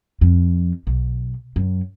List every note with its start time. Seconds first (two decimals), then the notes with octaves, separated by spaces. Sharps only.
0.21 F2
0.87 B1
1.56 F#2